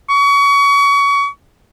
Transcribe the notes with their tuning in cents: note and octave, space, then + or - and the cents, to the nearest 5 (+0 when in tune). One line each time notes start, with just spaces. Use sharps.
C#6 +30